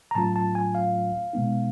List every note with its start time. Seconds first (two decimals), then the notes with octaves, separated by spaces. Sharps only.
0.11 A#5
0.15 A2 F#3 A3 C#4 F4 A5
0.36 A5
0.55 G#5
0.75 F5
1.33 B2 G#3 B3 D#4